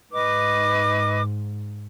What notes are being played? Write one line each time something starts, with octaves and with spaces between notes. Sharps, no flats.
G#2 B4 D#5 D6